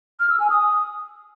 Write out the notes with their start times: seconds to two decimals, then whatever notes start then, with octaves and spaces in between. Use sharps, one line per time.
0.20 F6
0.30 E6
0.40 G#5
0.50 D#6